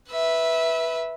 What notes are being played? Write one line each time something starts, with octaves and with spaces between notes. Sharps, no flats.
B4 E5